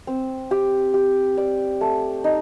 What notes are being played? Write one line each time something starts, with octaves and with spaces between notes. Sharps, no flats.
C4
G4
G4
D5
A3
D#4